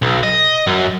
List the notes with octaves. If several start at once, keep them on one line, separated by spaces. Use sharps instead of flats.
B1
D#5
F#2